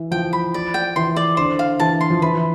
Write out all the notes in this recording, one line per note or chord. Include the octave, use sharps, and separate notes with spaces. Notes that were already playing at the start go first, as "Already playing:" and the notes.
Already playing: E3
F3 G5
B5
D5
G5
E3 C6
D5
D3 C5
F5
E3 A5
C6
F3
E3 B4